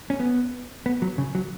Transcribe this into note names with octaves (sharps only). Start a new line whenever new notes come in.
C#4
B3
B3
F#3
C#3
F#3